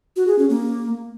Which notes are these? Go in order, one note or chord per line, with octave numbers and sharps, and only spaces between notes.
F#4
G#4
C#4
A#3